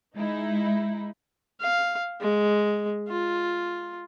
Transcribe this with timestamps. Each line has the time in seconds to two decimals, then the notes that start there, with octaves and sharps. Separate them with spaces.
0.15 G#3 D#4 E4
1.60 F5
2.21 G#3
3.08 F4